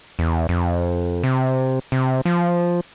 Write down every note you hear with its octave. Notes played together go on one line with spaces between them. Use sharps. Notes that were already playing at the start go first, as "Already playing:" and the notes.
E2
F2
C3
C3
F3